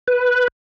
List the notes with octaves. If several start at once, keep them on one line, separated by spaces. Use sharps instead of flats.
B4